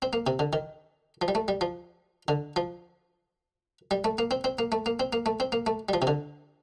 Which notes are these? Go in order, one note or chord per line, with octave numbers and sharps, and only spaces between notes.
C4
A#3
C3
D3
D#3
F3
G3
A3
G3
F3
D3
F3
G3
A3
A#3
C4
C4
A#3
A3
A#3
C4
A#3
A3
C4
A#3
A3
G3
F3
C3
D3